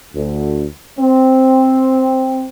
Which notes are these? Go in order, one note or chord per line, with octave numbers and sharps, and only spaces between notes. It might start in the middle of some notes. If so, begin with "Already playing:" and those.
D2
C4